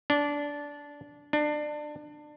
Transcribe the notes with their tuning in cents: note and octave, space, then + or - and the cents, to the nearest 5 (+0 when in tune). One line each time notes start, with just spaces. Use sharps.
D4 -15
D4 +25